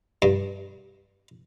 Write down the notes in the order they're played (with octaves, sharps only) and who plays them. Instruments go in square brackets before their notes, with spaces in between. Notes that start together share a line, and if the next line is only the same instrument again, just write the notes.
[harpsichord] G2